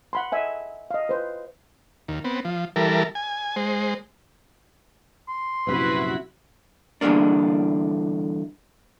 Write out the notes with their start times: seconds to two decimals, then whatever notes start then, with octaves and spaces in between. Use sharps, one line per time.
0.13 F#5 B5 C6
0.32 D#5 E5 G#5
0.91 D#5 F5
1.09 B4 C5
2.08 D#2
2.24 B3 C4
2.45 F3
2.76 E3 G3 A4 A#4
3.15 G#5
3.56 G#3 C5
5.28 C6
5.67 A#1 F#2 C3 E4 F#4 B4 B5
7.01 E2 G2 B2 D3 A#3 D4